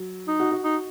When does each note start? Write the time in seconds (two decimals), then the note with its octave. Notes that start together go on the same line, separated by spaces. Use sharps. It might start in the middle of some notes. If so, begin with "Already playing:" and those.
Already playing: F#3
0.28 D#4
0.40 F#4
0.52 F#4
0.64 D#4